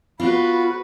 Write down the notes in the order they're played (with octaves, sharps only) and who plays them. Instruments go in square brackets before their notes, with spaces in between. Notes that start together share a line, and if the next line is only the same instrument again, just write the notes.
[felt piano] B3 [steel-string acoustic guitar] F4 [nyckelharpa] F#4 B4 [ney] B5